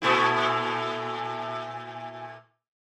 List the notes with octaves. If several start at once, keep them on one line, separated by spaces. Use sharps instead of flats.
A#2 A3 E4